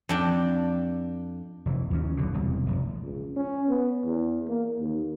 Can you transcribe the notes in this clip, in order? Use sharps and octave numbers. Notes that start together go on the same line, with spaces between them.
F2 D4 G5
F1 E3
D#2 E3 A#3 C#4
B1 B2 D3
E1 C2
F1
C#2
C#4
B3
E2
A#3
D#2